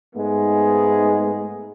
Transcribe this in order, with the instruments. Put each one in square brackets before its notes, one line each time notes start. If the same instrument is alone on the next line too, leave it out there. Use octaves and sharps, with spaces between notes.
[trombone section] G#2 G#3 A3 B3 D#4